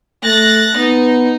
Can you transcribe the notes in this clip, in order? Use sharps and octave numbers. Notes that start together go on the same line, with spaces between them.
A3 F#6 A6 A#6
B3 D#4